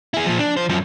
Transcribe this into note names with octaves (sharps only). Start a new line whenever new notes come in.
E4 G#4
A#2 F3
D4
F3 C5
F#2 F3